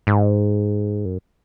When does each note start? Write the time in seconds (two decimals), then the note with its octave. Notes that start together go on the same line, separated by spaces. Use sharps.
0.07 G#2
1.05 F#2